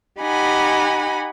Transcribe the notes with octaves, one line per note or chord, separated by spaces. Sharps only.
D#4 G4 F#5 G#5 B5